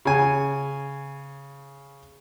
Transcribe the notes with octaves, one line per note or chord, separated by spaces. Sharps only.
C#3 G#5